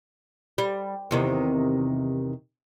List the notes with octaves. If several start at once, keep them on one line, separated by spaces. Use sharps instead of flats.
G3
E2 C3 D#3